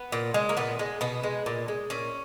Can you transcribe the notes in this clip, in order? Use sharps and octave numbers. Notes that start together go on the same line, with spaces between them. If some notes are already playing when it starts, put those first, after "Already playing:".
Already playing: B3
A#2
G#3
A#3
A#2 B3
G#3
B2 B3
G#3
A#2
G#3
A#2 C#4